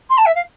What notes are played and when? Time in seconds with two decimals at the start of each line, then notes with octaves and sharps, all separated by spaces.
0.09 C6
0.17 A5
0.25 E5
0.35 F5